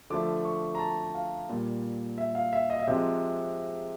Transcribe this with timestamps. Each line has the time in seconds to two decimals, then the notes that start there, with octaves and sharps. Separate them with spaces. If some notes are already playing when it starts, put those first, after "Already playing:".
0.10 D3 F3 A3 D6
0.45 C#6
0.75 A#5
0.79 A5
1.15 F5
1.49 A#2 G3
2.18 E5
2.35 F5
2.53 E5
2.70 D#5
2.80 E5
2.87 C3 F3 G#3 D#5